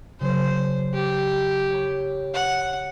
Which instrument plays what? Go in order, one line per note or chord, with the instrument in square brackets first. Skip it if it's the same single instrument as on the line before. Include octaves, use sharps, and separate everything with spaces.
[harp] C#3 F#3 [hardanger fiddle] C5
[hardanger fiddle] G4
[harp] C#5 G5 B5
[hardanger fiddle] F#5